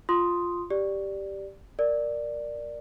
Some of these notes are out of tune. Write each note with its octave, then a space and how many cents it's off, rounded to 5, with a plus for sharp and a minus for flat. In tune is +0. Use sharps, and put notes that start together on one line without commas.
F4 +0 C6 +0 D#6 +0
G4 +0 D5 +0
A#4 +0 D5 +5